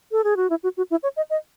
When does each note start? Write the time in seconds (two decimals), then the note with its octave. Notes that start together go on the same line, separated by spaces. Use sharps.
0.12 A4
0.24 G#4
0.37 F#4
0.50 E4
0.63 F#4
0.77 F#4
0.91 E4
1.03 C#5
1.17 D#5
1.30 D#5